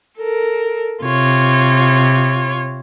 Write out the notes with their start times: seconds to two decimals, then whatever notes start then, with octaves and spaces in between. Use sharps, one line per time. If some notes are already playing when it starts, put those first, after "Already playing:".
0.19 A4 A#4
1.04 C3 F4 C#5